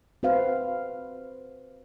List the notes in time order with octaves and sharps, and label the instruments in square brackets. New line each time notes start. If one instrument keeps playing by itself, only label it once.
[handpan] C4 F#4 B4 C5 F5